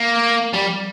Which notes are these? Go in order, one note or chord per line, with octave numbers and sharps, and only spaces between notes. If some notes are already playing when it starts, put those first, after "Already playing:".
Already playing: A#3
G3